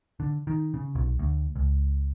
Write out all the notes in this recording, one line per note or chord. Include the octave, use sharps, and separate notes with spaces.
D3
D#3
C#3
B1
D2
C#2